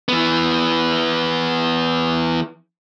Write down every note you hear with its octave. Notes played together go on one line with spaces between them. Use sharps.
E3 B3